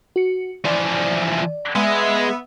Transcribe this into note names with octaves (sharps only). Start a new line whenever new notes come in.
F#4 C#7
E3 F3 D5
G#3 B3 E5